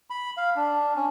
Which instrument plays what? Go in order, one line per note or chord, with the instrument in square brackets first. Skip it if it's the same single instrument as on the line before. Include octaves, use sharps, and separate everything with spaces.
[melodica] B5
F5
D4
C#4